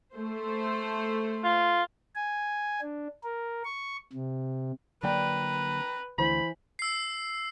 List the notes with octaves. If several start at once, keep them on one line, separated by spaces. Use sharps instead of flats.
A3 C5
F4
G#5
D4
A#4
C#6
C3
D3 F#3 A#3 B4 D5 G5 A#5
D2 D3 E3 C5 B5
E6 C7